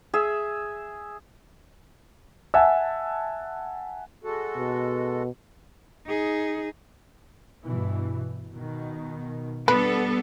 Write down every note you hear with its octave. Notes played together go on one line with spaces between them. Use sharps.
G#4 E5
E5 F#5 G#5 A5 E6
G#3 F#4 A4
B2
D#4 G#4
G2 B2 E3
B2 D#3
G3 B3 D4 A4 B4